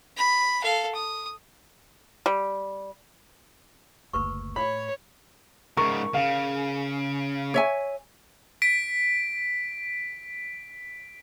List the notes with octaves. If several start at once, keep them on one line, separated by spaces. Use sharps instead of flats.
B5
A4 F5
D#6
G3
F#1 D2 A#4 B4 C#6
A2 C#5 B5
G#2 C#3 A#4 C#6
C#3 F5
C#5 E5 G#5
B6 D7